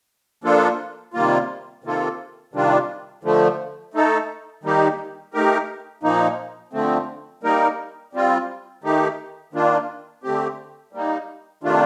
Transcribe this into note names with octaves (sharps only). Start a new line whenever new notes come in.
F3 A#3 D4 F4 A4
C3 D#3 G3 A#3 F4
C3 D#3 A#3 F4 A4
C3 D#3 G3 D4 F4
D3 F3 A3
A3 D#4 A4
D#3 G3 A#3 D#4 G4
A3 D#4 G4 A#4
A#2 F3 A#3 D#4
D3 F3 A3 C4
G3 A#3 D#4 A#4
G3 C4 F4
D#3 A3 D#4 G4
D#3 A#3 D4 F4
D3 A3 C4 G4
G3 A#3 D#4
C3 D#3 A3 D4 F4